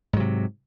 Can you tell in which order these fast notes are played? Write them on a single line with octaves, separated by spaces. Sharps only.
G#2 F#3 C3